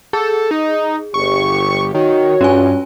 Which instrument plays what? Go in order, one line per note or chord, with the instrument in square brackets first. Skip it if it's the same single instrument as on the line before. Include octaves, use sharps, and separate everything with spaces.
[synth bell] G#4 [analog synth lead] A4
[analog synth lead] D#4
[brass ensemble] G1 G4 [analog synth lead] C#6
[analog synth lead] D#3 [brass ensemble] F#4 C#5
[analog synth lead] G2 [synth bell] C#4 F4 G#5